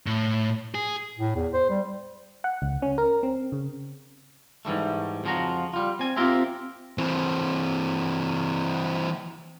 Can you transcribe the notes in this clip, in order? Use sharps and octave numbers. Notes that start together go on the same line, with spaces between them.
A2
G#4
A2
E2
C5
G3
F#5
C#2
C#4
A#4
C4
C#3
G#2 E3 G3 A3
F2 C#3 F3 F#4 A#5
G3 F4
C4 G#5
C4 F4 G4 A#4 C5 E5
E3 C4